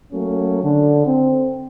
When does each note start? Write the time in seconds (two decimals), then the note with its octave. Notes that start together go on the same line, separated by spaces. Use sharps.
0.12 F#3 A3 A#3 C#4
0.63 D3
1.06 C4